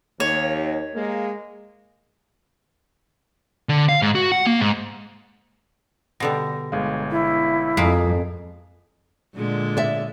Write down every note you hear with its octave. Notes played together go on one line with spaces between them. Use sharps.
D#2 C#5
G#3 A#3
D3
F5
G#2
F#4
F#5
A#3
G#2
B2 D3 G3 A#6
G1 G#3 F5
E4
F2 G#3 A#3 B6
A#2 D3 G#3
D5 E5